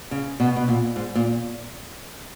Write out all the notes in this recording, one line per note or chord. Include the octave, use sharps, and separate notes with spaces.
C#3
B2
B2
A#2
G#2
A#2